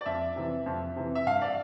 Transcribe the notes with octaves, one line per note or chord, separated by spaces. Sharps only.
D5
F2 E5
C3 E3
F2
C3 E3
E5
G2 F5
D5